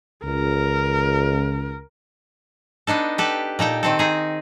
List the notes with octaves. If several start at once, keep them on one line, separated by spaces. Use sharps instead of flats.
C#2 A#4
B3 D4 D#4 A4
G4 A4 B4
A#2 D#4 A4 G5
D#3 C4 A4
D#4 G#4